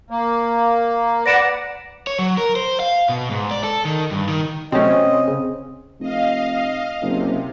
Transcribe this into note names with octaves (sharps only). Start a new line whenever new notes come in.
A#3
B4 D5 F#5 A#6 D7 E7
C#5
F#3
A#4
C5
F5
B2
G#2
D5
A4
D#3
G2
D#3
C3 F#3 A3 C4 C#4 D#5
C#3
F1 D#5 F5
F#1 C3